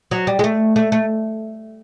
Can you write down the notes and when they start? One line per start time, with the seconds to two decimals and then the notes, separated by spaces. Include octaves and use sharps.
0.11 F#3
0.27 G3
0.39 G#3
0.44 A3
0.76 A3
0.92 A3